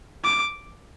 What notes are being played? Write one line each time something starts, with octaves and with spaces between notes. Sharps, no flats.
D6